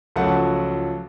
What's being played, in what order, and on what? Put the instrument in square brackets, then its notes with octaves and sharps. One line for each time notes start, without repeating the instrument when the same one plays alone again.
[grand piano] C#2 F3 F#3 A3 F#5 A5